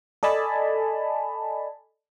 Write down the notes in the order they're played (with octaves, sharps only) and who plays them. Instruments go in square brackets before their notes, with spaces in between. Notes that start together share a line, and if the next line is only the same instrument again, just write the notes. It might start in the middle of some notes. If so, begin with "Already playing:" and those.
[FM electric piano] A4 D5 D#5 G#5 A5 B5